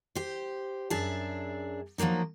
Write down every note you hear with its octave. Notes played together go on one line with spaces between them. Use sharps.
G4 C5
F#2 D4 G#4 E5 A5
F3 F#3 A3 A#3 D#4